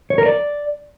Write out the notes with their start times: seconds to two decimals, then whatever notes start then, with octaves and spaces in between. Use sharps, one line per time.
0.10 C#5
0.18 A#4
0.26 D5